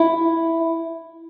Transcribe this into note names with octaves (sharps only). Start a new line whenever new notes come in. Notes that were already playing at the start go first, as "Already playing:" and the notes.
Already playing: E4